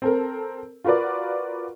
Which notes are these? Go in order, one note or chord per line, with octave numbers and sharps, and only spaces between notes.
C4 A4 A#4
F4 F#4 A#4 B4 D5